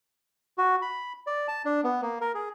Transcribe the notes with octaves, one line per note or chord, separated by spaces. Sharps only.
F#4
B5
D5
A5
D4
B3
A#3
A#4
G#4